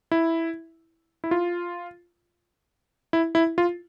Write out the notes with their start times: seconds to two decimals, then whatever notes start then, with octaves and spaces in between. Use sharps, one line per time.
0.11 E4
1.24 E4
1.31 F4
3.13 E4
3.35 E4
3.58 F4